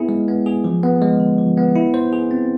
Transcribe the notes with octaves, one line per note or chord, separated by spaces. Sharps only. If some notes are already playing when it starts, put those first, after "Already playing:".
Already playing: B3 E4 G#4
G#3
B3
G#4
F3
B3
G#3
D3
F3
B3
E4
C5
G#4
C4